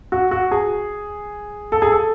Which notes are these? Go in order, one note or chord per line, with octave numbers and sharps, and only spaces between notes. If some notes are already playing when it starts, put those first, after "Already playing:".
F#4
F#4
G#4
A4
G#4
A4